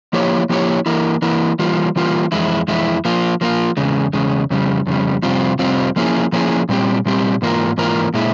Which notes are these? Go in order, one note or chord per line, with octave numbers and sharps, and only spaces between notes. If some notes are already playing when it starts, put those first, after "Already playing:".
F3 A#3 E4 G4 C#5
F3 A#3 E4 G4 C#5
E3 A#3 E4 A#4
E3 A#3 E4 A#4
E3 G3 A#3 F4
E3 G3 A#3 F4
F2 E3 G#3 E4
F2 E3 G#3 E4
F3 A#3 F4
F3 A#3 F4
E2 C#3 G#3
E2 C#3 G#3
F2 C#3 G3
F2 C#3 G3
F2 C3 G3 C4 F4
F2 C3 G3 C4 F4
F3 A#3 C#4 E4 G#4
F3 A#3 C#4 E4 G#4
A#2 G3 C4 G4
A#2 G3 C4 G4
G#2 E3 A#3 F4 A#4
G#2 E3 A#3 F4 A#4
A#2 G#3 E4